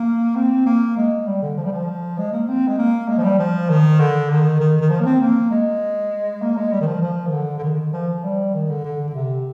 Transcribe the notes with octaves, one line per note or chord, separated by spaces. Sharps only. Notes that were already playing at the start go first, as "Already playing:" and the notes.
Already playing: A#3
C4
A#3
G#3
G3
D3
F3
G3
F3
G#3
A#3
C4
G#3
A#3
G#3
F3
G3
F3
D#3
D3
D#3
D#3
D#3
F3
A#3
C4
A#3
G#3
A#3
G#3
G3
D#3
F3
F3
D#3
D3
D3
D#3
F3
G3
D#3
D3
D3
D3
C3